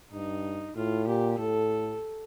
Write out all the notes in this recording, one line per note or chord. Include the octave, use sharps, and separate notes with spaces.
G2 D#4
A2 F4
A#2 G4
A2 A4